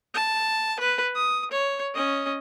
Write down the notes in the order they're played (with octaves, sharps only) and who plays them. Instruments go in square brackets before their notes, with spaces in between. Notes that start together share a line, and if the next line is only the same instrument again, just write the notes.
[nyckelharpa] A5
B4
D#6
C#5
C#4 D#5